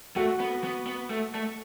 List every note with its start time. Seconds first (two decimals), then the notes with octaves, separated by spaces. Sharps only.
0.16 A3 F#4
0.40 B3
0.64 B3
0.86 B3
1.10 A3
1.35 A3